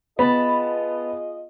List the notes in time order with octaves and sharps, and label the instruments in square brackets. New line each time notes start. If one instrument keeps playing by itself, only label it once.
[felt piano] B3 [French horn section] F4 G#4 D#5 [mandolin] A5 B5